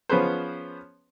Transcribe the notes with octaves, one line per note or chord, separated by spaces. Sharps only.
F3 B3 C#4 G#4 B4 C5